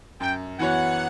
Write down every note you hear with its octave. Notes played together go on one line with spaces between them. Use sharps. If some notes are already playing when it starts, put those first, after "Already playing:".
F#2 G5
E3 B3 F#4 C#5 F#5